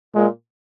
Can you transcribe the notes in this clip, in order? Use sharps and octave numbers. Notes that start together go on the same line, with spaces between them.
A#2 G#3